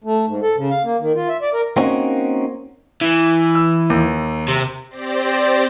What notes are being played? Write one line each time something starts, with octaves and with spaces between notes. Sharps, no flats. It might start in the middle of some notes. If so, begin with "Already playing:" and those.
A3
G#2
A4
C#3
F5
A#3
D#3
F4
E5
D5
A#4
A#3 C4 C#4 D#4 F#4
E3
E6
D#2
C3
C4 G4 C5 D5 A6 A#6